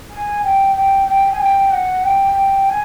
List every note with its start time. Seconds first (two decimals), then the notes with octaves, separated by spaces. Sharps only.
0.10 G#5
0.43 G5
0.75 G5
1.07 G5
1.32 G#5
1.40 G5
1.71 F#5
2.04 G5
2.70 G#5